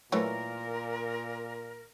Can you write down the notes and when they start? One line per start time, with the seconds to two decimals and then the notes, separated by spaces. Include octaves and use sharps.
0.12 A#2 E3 F#3 A3 A#4 C#5